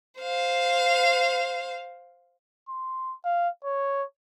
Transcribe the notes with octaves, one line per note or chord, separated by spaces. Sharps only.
C5 F5
C6
F5
C#5